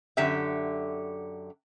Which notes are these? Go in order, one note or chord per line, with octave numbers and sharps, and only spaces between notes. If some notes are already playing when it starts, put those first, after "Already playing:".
F#2 D3 G4 E5